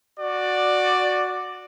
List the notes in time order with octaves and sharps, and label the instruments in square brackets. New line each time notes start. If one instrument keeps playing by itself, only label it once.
[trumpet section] F#4 D5